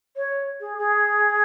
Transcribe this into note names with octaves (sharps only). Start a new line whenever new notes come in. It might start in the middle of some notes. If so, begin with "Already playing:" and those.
C#5
G#4
G#4